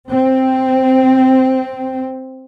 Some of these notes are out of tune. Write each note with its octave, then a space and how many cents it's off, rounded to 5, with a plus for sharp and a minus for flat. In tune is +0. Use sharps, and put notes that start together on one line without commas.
C4 -5